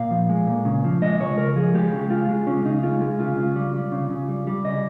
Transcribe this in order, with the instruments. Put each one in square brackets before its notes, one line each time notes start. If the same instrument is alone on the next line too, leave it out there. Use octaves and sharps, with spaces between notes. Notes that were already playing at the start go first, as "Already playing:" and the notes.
Already playing: [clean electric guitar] A#2 F5
F3
G#3
A#2
C#3
F3
G#3 D#5
C#3 C#5
C#3 A#4
F3 G#4
G#3 G4
C#3
G#3 F4
G#3
C#3 C#4
C#3 D#4
G#3 F4
G#3
C#3 F4
C#3
G3
G3
C#3
C#3
G3
G3
C#3 D#5